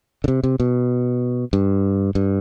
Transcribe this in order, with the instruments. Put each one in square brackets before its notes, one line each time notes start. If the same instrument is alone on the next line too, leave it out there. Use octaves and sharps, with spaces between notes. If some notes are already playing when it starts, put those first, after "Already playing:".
[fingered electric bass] D3
C3
C3
B2
G2
G2